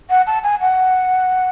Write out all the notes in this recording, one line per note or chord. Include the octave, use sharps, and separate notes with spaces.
F#5
A5
G#5
F#5